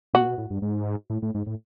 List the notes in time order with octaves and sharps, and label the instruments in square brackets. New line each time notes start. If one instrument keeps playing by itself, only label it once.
[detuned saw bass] B2 [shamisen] F#4
[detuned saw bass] A#2
B2
A2
G2
G#2
A2
A2
G#2
A2